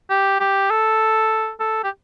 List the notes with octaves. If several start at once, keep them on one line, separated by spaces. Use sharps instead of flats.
G4
G4
A4
A4
G4